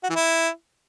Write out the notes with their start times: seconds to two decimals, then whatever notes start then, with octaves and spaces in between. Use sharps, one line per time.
0.03 F#4
0.10 E3
0.16 E4